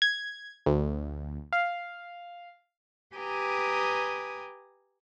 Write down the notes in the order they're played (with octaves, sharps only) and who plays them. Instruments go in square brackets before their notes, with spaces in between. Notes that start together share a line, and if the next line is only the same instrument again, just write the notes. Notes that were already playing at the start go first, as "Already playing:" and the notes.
[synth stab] G#6
D2
F5
[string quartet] G4 B4 G5 G#5 A#5 D#6